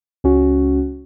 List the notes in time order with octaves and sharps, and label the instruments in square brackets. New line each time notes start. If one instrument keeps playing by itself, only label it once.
[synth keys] C#2 C#4 F#4